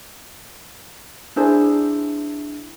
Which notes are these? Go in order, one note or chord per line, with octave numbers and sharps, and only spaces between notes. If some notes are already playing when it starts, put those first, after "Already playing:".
D4 E4 G#4 C5